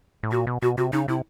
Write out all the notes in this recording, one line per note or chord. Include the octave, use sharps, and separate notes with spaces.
A2
A#2 F#4
B2
B2 F#4
C3 F#4
C#3 D#4
C3 E4